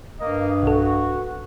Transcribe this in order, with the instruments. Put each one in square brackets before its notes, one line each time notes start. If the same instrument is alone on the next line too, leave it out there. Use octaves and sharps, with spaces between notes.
[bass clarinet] G2 [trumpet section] A#3 D#5
[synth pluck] B1 A4 [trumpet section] F#4